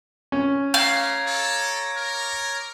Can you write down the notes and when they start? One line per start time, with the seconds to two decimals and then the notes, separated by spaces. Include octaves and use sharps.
0.32 C#4
0.74 A3 C#5 F5 A#5 D6
1.26 A4
1.97 A#4